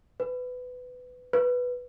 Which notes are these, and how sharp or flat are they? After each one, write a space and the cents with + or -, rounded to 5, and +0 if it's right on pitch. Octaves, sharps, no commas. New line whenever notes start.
B4 +20
B4 +0